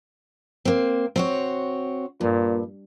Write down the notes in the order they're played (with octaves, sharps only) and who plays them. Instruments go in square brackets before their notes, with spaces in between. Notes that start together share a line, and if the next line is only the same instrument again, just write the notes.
[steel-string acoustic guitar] A#3 C4
C4 F#4 C#5
[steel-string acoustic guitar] G2 [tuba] A#2